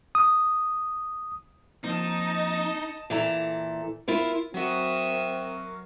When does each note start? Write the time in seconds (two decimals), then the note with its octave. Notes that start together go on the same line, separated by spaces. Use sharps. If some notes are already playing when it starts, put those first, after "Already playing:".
0.15 D#6
1.84 F3 A#3 C4 D#4 D#5 A5
3.10 A#2 E3 A4 A#5
4.08 E4 F4 A#4
4.54 F#3 C4 F#4 A#4 E5 D#6